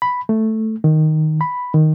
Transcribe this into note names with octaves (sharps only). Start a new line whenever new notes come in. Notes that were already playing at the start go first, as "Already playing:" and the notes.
B5
A3
D#3
B5
D#3